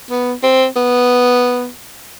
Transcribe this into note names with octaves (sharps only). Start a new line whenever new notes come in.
B3
C4
B3